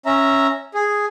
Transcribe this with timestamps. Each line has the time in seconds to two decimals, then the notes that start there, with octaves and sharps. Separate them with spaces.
0.06 C#4 E5 A#5
0.74 G#4